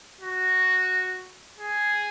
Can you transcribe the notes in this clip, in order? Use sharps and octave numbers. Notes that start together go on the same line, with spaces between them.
F#4
G#4